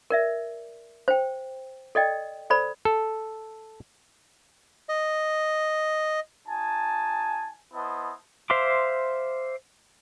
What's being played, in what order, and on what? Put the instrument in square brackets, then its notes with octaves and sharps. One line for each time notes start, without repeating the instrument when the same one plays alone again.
[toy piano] A#4 D5 E5
C5 G5
A4 D5 D#5 G5
A4 C5 D5 B5
[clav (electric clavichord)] A4
[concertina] D#5
[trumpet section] D#4 F#4 G#5 A5
B3 E4 C5 D#5 A5
[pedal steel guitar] C5 E5 F5 C6 D6